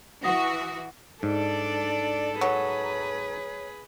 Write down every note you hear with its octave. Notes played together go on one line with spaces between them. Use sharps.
E3 F#4 F#5 D#6 A#6
G#2 D4 A4 D5
F#3 G#4 B4